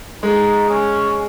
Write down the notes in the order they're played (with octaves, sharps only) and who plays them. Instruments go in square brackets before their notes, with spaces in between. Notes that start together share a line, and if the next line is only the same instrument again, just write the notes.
[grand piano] G#3 [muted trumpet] D#4
[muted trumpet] C#4